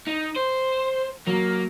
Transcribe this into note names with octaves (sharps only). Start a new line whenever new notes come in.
D#4
C5
F#3 A#3